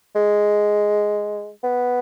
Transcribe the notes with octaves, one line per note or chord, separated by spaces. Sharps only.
G#3
B3